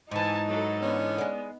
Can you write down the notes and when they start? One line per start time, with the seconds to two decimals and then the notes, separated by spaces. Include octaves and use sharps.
0.11 G#2 E3 D#4 G#5 A5
0.47 F#3 A4
0.82 D3 B3 C#4
1.18 G#3 D5